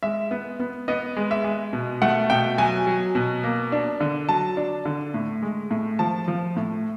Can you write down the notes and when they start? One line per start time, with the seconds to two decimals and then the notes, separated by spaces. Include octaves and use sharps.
0.03 G#3 E5
0.31 B3
0.60 B3
0.88 B3 D#5
1.17 G#3
1.31 E5
1.45 G#3
1.73 B2
2.02 A3 F#5
2.30 B2 G5
2.58 F#3 G#5
2.87 F#3
3.15 B2
3.44 A#3
3.72 D4
4.01 D3
4.29 F#3 A5
4.57 D4
4.85 D3
5.14 A2
5.43 G#3
5.71 A2
5.99 F3 A5
6.28 F3
6.56 A2